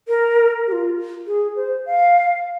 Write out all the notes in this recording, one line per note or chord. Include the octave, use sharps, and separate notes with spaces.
A#4
G4
F4
G#4
C5
F5